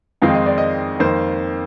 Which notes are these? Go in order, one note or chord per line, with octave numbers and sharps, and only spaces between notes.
F2 D#3 G#3 C4 D#4 F5
D#5
D5
D#5
F2 D#3 A#3 C5